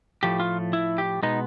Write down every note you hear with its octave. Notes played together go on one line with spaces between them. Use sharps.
A2 F3 A3 G4
F4
E4
G4
B2 G#3 B3 D#4